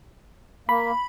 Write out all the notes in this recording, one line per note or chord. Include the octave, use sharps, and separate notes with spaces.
A#3 B5